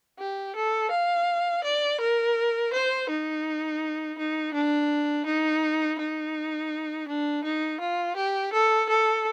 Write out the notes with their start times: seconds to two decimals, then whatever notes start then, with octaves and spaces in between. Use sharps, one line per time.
0.19 G4
0.56 A4
0.91 F5
1.64 D5
2.00 A#4
2.73 C5
3.09 D#4
4.18 D#4
4.54 D4
5.26 D#4
5.99 D#4
7.08 D4
7.44 D#4
7.80 F4
8.16 G4
8.53 A4
8.89 A4